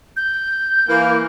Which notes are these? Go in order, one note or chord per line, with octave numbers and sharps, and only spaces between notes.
G6
E3 A#3